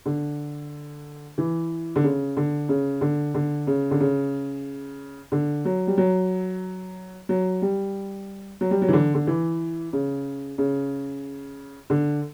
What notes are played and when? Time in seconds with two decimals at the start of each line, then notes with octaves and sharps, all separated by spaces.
0.06 D3
1.38 E3
1.96 D3
2.04 C#3
2.37 D3
2.69 C#3
3.01 D3
3.34 D3
3.67 C#3
3.91 D3
4.01 C#3
5.32 D3
5.65 F#3
5.87 G3
5.98 F#3
7.29 F#3
7.62 G3
8.61 F#3
8.71 G3
8.82 F#3
8.89 E3
8.93 D3
9.14 D3
9.27 E3
9.93 C#3
10.58 C#3
11.90 D3